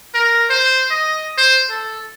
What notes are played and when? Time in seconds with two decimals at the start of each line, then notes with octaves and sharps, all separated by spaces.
0.14 A#4
0.50 C5
0.91 D#5
1.38 C5
1.70 A4